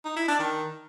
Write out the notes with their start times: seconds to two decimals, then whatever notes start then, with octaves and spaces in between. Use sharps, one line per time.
0.05 D#4
0.16 E4
0.28 D4
0.40 D#3